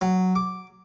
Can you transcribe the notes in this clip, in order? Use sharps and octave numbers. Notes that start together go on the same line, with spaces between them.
F#3
D6